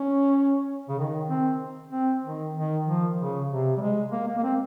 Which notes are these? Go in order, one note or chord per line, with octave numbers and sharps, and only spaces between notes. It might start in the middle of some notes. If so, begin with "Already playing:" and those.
Already playing: C#4
C#3
D#3
C4
C4
D#3
D#3
F3
C#3
C3
G3
G#3
A#3
A#3
A#3
C4